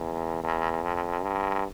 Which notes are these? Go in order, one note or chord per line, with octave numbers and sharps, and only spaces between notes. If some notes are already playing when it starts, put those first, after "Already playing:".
Already playing: E2
E2
F2
G2